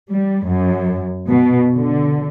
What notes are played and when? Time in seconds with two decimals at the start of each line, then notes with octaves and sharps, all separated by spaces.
0.12 G3
0.47 F#2
1.28 B2
1.75 D3